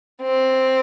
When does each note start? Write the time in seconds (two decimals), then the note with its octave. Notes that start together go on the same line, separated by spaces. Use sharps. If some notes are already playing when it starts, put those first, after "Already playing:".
0.22 C4